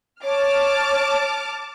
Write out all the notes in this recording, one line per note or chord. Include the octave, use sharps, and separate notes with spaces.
C#5 A5 D6 F6